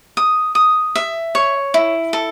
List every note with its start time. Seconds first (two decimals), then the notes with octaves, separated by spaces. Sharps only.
0.17 D#6
0.55 D#6
0.95 E5
1.35 C#5
1.74 E4
2.13 A4